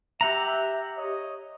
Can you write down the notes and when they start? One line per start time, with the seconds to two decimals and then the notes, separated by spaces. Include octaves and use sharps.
0.21 G4 E5 F#5 A#5
0.97 C#5 D#5